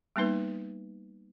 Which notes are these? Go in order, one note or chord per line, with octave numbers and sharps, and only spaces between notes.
G3 A#3 B3 D#4 B4